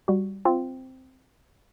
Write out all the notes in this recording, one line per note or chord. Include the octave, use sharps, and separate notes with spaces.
G3 F#4
C4 F4